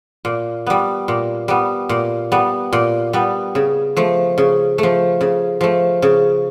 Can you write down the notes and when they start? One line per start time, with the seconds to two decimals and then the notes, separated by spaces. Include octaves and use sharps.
0.25 A#2
0.67 G3 B3
1.08 A#2
1.48 G3 B3
1.89 A#2
2.32 G3 B3
2.73 A#2
3.13 G3 B3
3.55 C#3
3.97 F3 A3
4.38 C#3
4.78 F3 A3
5.21 C#3
5.61 F3 A3
6.02 C#3